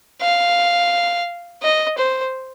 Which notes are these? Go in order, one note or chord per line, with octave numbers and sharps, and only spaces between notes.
F5
D#5
C5